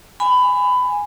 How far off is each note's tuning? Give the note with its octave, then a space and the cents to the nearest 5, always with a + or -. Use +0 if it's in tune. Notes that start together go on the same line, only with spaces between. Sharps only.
G#5 -10 B5 +20